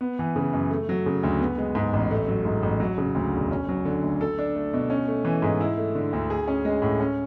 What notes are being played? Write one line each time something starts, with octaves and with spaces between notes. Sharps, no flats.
B3
E3
C#3
F#2
A3
F#3
C#3
D2
B3
G#3
G#2
A1
A3
F#3
G#2
A1
F#3
C#3
D2
E1
C#4
F#3
D3
D2
A4
D4
A3
B2
C#4
A3
E3
G#2
E4
A3
D3
D2
G#4
C#4
G#3
A2
C#4